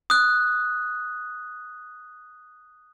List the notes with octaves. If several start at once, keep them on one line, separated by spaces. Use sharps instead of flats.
D#6 F#6